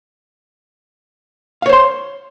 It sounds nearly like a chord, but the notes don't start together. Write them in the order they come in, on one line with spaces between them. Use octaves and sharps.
F5 C#5 C5 C6